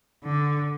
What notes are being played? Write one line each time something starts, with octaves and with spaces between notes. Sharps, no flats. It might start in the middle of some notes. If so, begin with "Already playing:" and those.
D3